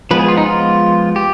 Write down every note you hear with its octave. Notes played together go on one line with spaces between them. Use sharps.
F3 G#3 B3 B4
G#4
F4
D#4
F4
G4